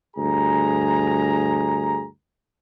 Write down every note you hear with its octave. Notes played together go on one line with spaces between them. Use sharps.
D2 G2 G#4 A#5